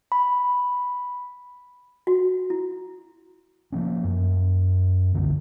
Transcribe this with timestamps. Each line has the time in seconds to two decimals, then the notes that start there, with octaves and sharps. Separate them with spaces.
0.12 B5
2.07 F#4
2.50 E4
3.72 F3 A#3 C#4
4.04 F#2
5.14 G1 C2 D3